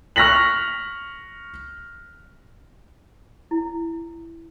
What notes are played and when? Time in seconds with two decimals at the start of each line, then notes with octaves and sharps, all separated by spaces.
0.16 C#6 F6 F#6 A#6 B6 F#7
3.51 E4